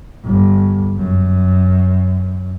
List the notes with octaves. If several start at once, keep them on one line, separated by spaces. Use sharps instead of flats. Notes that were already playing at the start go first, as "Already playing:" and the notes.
G1
F#2